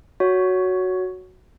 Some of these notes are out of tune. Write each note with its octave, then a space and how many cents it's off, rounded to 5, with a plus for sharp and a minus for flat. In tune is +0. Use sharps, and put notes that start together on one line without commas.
F#4 +0 C#5 +15